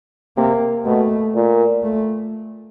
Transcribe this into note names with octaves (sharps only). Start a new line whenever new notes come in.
C3 A#3
B2 A3
A#2
A3